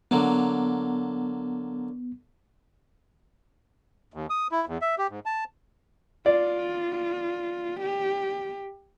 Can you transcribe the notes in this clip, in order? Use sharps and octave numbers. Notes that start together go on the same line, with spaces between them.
D3 F#3 A#3 B3
D#2
D#6
E4
E2
E5
G4
G#2
A5
F4 D5
G4